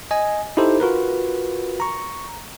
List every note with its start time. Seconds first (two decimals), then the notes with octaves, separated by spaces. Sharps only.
0.11 D#5 G#5
0.57 D#4 E4 G4 A4 C5
0.80 F4 F#4 A#4 B4
1.80 A#5 C#6